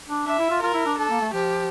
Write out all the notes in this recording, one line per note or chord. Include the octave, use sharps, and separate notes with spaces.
D4
D4 E5
E4
F4
F4 A#4
E4
D4
D4 A4
A#3
A3
F3 G4